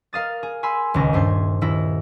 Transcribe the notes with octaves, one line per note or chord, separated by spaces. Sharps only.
A#4 F5 D#6 A6
G#4
G#5 B5 C6 E6
D#1 C#2 A#6
G2 A3 C5 G#6
D#1 E4 A#6